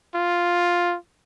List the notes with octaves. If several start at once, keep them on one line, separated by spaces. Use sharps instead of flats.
F4